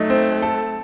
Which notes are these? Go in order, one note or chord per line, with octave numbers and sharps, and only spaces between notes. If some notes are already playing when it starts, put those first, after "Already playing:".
Already playing: F#3 A3 D#4
C4
A4